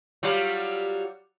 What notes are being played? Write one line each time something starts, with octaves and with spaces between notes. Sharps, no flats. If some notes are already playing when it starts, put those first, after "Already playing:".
F#3 G3 F4